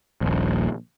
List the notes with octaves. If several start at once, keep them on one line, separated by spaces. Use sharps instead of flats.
D#1 A#1